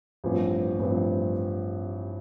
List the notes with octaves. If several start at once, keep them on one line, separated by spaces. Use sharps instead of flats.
A1 G2 F3 C4
A1 G2 F3 C4